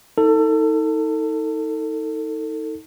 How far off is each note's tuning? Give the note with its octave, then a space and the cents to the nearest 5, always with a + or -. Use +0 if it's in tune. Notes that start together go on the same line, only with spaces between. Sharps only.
D#4 +30 A4 +25